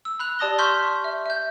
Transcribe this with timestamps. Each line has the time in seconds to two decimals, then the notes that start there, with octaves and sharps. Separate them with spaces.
0.05 E6
0.20 B5 F#6 F7
0.39 G4 D5 A5 D#6 A#6 G7
0.59 C6 C#6 F6 G6 B6
1.04 E5
1.26 E5 G6